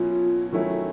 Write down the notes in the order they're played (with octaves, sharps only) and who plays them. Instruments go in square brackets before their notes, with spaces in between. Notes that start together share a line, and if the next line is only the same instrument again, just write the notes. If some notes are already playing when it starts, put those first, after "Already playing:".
Already playing: [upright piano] B2 F#3 A#3 C#4 E4 [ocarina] F4
[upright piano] D#3 F#3 A3 C#4 E4